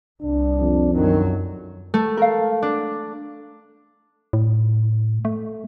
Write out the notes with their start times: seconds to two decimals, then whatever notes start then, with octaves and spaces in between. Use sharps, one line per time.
0.23 C2 D4
0.61 F2
0.95 F#2 D#3 F#3
1.94 A3
2.17 A#4 F5
2.62 D4
4.33 A2
5.25 A3